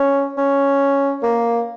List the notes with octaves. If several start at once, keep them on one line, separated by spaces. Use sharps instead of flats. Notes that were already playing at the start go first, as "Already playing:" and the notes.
Already playing: C#4
C#4
A#3